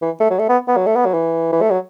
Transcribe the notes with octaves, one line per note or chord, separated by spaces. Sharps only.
E3
A3
F#3
A3
B3
B3
F#3
A3
B3
F#3
E3
E3
A3
F#3